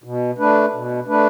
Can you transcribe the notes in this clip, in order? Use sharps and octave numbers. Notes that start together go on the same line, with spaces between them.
B2
A3 D4 B4
B2
A3 D4 B4